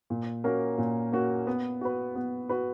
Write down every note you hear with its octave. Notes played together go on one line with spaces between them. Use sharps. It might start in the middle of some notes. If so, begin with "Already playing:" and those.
A#2
A#3 C#4 F#4 A#4
A#2
A#3 C#4 F#4 A#4
B3
F#4 B4
B3
F#4 B4